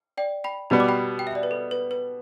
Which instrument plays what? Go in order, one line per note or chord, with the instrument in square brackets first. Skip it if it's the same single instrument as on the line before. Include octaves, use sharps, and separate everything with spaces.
[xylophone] D5 G5
G5 B5
[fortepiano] B2 G3 B3 [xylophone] B5
[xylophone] D6
G5 B5
G5
E5
D5
B4
A4
B4
B4